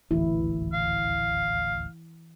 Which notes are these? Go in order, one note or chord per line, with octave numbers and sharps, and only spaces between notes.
D#1 A1 D2 E3 E4
F5